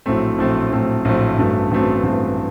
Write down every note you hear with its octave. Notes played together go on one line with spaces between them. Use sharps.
A#1 A2 F#3 A3 C4
A#1 A2 F#3 A3 C4
A#1 A2 F#3 A3 C4
A#1 A2 F#3 A3 C4
A1 G2 F#3 A3 C4
A1 G2 F#3 A3 C4
A1 G2 F#3 A3 C4